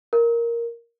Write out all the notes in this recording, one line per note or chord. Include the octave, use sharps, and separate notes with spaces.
A#4